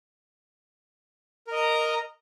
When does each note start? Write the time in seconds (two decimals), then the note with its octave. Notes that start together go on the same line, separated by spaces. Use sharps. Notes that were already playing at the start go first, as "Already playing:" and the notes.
1.47 A#4
1.52 D#5
1.56 A#5